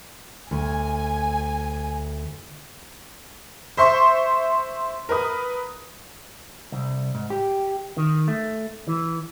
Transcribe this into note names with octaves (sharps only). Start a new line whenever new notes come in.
D2 G#5
C5 E5 C6 C#6
A#4 B4 D#6
C2
G#2
G4
D#3
A3
E3